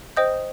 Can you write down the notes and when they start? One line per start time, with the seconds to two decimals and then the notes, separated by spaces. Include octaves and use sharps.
0.17 C5 D#5 G5 D#6 G6